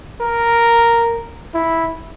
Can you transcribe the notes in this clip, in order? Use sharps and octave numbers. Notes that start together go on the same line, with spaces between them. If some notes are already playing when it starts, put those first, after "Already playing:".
A#4
E4